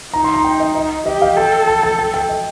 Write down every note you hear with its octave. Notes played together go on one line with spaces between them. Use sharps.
D#4 A#5
C6
A#5
G5
D#5
D#5
G4 D#5
F5
A4 G5
A5
A5
G5
G5
D#5